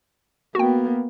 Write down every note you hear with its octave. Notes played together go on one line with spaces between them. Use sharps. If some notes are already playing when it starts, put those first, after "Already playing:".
A#3 B3 F#4 G5